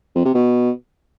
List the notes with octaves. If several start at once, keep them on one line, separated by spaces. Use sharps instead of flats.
F2
C3
B2